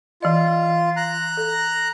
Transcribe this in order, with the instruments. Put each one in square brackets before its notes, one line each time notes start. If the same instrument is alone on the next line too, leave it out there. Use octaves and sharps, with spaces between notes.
[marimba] E3 D5 D#5 [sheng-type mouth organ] F4
[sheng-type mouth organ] A#5 F#6
[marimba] A4